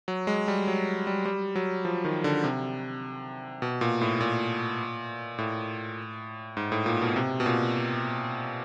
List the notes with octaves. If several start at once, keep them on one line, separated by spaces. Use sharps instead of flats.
F#3
G#3
G3
F#3
G3
G3
F#3
F3
D#3
D3
C3
B2
A#2
A2
A#2
A2
G#2
A2
A#2
B2
C3
B2
A#2